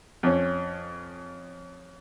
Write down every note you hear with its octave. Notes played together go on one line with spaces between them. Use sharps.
F2 C#4